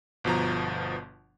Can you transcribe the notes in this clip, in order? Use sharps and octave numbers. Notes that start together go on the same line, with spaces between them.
G1 B2 F3 A#5